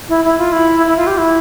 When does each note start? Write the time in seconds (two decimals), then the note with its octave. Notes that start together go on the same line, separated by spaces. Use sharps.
0.09 E4
0.25 E4
0.38 F4
0.52 E4
0.87 E4
0.97 F4
1.07 G4
1.18 E4